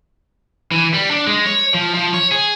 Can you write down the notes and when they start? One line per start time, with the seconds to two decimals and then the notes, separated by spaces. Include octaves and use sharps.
0.72 E3
0.94 G3
1.11 D4
1.27 G#3
1.46 C#5
1.74 F3
1.94 F3
2.14 C#5
2.31 G#4